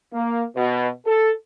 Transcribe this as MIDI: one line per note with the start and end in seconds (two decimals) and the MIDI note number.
0.13 0.43 58
0.56 0.88 47
1.06 1.30 69